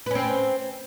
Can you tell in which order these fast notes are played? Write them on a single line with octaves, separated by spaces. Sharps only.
B4 C#4 C4